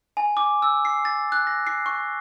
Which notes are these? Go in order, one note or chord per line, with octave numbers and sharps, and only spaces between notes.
G#5
D6
E6
C7
A6
F#6
A#6
C7
C#6